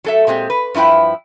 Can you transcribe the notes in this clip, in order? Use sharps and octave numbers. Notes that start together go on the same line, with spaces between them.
F#3 A4 E5
A#2 G#3 C4 G4
B4
G2 F3 E4 B4 G5